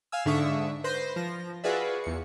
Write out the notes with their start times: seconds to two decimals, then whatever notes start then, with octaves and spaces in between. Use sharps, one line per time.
0.12 F5 G#5 E6
0.25 G#2 D3 D4 E5 C#6 D#6
0.84 B4 C5 C6 G6 A#6
1.16 F3 A#6
1.64 F4 F#4 G#4 B4 D5 E5
2.04 E2 C#7